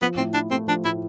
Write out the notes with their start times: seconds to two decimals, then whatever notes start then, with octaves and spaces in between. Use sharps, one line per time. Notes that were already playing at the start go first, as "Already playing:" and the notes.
0.02 F3 B3
0.17 A2 C4
0.34 D4 E4
0.51 A3 C4
0.68 F3 D4
0.85 A2 E4